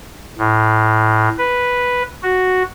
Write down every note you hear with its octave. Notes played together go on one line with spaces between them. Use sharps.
A2
B4
F#4